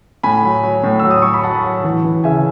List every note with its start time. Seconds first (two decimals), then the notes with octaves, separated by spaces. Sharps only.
0.23 A2 G#5 B5
0.43 F#3
0.63 F#3
0.83 A2
1.00 F#3 E6
1.11 D#6
1.22 F#3 C#6
1.33 B5
1.44 F#3 F#5 A5
1.64 F#3
1.84 E3
2.04 E3
2.24 C#3 E5 G#5